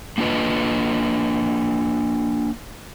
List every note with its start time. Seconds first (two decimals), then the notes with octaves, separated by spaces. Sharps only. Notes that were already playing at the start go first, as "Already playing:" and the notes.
0.18 A#3 D4 F4 B4 D#5